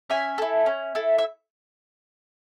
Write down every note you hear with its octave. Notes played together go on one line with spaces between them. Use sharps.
C#4 E5 G#5
E4 A4
C#4
E4 A4
E5